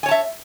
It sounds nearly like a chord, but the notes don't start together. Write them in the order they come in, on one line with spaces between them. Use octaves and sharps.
G#5 C#5 A5 E5